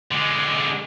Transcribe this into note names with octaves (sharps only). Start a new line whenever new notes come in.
D3 G#3